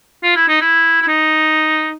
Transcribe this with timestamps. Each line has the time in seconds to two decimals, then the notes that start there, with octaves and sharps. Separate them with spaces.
0.24 F4
0.36 E4
0.48 D#4
0.61 E4
1.02 E4
1.08 D#4